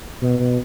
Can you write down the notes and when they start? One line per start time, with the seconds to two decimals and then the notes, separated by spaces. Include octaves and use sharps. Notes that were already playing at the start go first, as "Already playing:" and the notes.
0.21 B2
0.39 B2